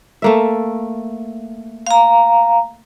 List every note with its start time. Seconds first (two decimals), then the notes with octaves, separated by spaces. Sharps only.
0.22 A3 A#3 E5
1.87 F5 A#5